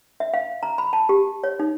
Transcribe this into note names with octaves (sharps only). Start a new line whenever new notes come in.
E5
F5
A#5
B5
A5
G4
C#5
D#4